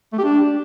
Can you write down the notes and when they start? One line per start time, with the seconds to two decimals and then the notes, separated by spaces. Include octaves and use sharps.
0.13 A3
0.18 G4
0.24 D4